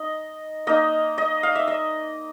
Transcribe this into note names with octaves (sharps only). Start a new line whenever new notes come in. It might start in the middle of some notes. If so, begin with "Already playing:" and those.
Already playing: D#4 D#5
A#3 D#4 D#5
D#5
F5
E5
D#5